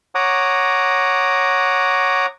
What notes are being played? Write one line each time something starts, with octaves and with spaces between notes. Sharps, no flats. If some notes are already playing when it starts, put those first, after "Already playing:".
C#5 F#5 A#5 D6 D#6